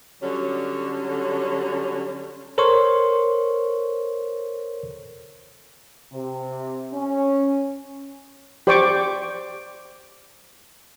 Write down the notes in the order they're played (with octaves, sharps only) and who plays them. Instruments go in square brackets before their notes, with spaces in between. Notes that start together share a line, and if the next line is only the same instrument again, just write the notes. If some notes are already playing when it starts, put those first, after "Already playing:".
[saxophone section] D3 F#3 G3 C#4
[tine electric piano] A4 A#4 C5 C#5 C6 C#6
[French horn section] C3
C#4
[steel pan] G4 C5 D5 G5 C#6 D6